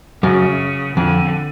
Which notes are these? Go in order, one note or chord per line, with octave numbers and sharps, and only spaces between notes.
F#2 C#3
F2 D3